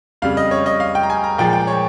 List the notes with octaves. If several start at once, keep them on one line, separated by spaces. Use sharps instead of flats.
F2 C#3 G3 F5
D#5
C#5
D#5
F5
G5
A#5
G#5
A#5
A#2 F3 G#3 G5
G5
C#5